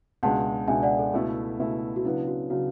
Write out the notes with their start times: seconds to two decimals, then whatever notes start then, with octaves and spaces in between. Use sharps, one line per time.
0.23 C#2 B2 G#3 D4 F#5 A5
0.68 C#2 B2 G#3 D4 E5 G#5
0.83 D5 F#5
0.99 A4
1.13 C#2 B2 A3 E4 A4
1.59 C#2 B2 A3 E4
1.96 F#4
2.05 C#3 F#3 B3 D4 E4
2.27 F#4
2.50 C#3 F#3 B3 D4 F#4